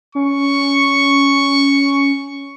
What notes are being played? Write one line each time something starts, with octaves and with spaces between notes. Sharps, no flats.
C#4 C#6